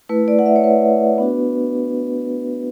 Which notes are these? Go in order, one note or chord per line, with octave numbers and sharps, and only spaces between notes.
A3 E4 B4
D5
F#5
E5
C#5
B4
B3 D4 F#4